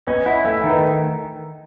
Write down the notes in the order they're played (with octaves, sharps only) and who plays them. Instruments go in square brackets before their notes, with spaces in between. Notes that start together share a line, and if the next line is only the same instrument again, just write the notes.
[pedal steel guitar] C#4 [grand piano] B4 D#5
[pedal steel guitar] E4 [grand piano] D#5 F#5
[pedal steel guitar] A3 [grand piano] E5 G#5
[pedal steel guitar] D#3
[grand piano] B4 D#5